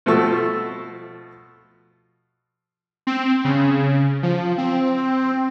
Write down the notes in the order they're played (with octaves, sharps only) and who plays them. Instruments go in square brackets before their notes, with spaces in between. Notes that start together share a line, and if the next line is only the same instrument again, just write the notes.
[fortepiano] B2 F3 A3 A4 C#6 E6
[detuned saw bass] C4
C#3
F3
C4